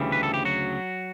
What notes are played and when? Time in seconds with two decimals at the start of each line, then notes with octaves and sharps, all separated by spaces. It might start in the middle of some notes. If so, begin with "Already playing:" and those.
Already playing: D2 C#3 E3 G3
0.12 B4
0.23 A4
0.34 G4
0.45 F#3 F#4